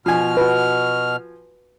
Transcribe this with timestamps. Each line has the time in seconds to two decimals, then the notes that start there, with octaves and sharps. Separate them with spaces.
0.06 B2 F3 G#5 F6
0.37 F#4 B4